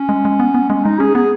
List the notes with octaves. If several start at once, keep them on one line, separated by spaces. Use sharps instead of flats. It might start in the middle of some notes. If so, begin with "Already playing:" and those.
Already playing: C#4
G#3
G#3
B3
B3
G#3 C#4
G#3 D#4
C#4 G#4
B3 G#4